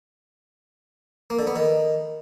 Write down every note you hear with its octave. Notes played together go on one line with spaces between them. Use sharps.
A#3
D3
B3
D#3